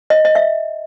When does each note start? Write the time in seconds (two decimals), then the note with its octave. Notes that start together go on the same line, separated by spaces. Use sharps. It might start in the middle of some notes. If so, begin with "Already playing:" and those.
0.10 D#5
0.25 D#5
0.35 E5